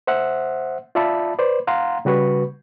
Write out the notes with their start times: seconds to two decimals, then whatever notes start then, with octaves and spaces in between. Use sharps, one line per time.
0.07 C5 E5 F#5
0.95 F4 D5 E5 A5 B5
1.39 B4 C5 D5
1.67 F5 F#5 A#5 C6
2.05 C#3 G3 F#4 B4 C#6